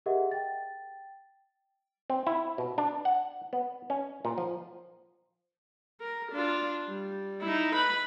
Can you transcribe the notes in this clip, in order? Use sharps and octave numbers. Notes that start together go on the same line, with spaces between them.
G4 G#4 A#4 D#5 E5 F#5
G5 A6
C4
E4
B2
D4
F#5
B3
C#4
A#2
F3
A#4
D4 F4
G3
D#4 E4
B4 B5